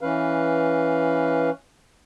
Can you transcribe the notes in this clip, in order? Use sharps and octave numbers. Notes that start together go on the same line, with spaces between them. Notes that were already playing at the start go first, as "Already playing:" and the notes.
E3 C#4 B4 F5